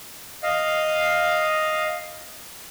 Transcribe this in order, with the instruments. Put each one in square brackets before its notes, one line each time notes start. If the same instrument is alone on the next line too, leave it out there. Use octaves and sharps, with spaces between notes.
[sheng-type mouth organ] D#5 F5